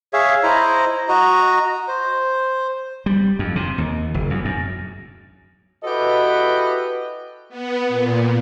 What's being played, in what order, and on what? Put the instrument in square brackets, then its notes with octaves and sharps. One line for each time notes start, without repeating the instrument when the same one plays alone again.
[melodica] G#4 C#5 E5 F5
E4 C5 D#5 A#5
F#4 D#5 A#5
C5
[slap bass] G3
F2
C3
D#2
F#1
E2
F#2
[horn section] E4 F#4 G4 A4 B4 D#5
[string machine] B3
A#2